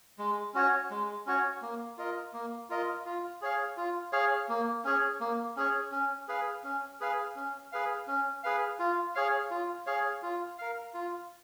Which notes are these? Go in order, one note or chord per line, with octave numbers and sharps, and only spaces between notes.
G#3
C#4 F#4 C#5
G#3
C#4 F#4 C#5
A#3
F4 A#4 D#5
A#3
F4 A#4 D#5
F4
G#4 C#5 F5
F4
G#4 C#5 F5
A#3
C#4 G#4 C#5
A#3
C#4 G#4 C#5
C#4
G#4 B4 F5
C#4
G#4 B4 F5
C#4
G#4 B4 F5
C#4
G#4 B4 F5
F4
G#4 C#5 F5
F4
G#4 C#5 F5
F4
A#4 F5
F4